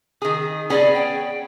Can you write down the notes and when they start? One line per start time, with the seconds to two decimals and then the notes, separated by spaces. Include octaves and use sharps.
0.22 D#3 G#4 D#6
0.70 B3 C#4 G#4 D5
0.94 G5